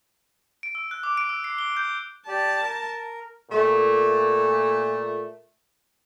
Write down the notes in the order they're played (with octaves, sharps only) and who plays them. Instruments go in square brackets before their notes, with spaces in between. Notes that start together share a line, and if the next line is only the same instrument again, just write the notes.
[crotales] D7
E6
F#6
D6
D7
E6
C7
G7
G6
[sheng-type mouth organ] G4 D5 [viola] A5
[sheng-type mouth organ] A#4
[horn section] A#2 A3